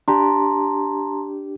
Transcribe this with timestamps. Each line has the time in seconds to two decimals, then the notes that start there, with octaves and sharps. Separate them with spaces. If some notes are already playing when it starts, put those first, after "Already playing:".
0.08 D4 G4 A5 A#5 C6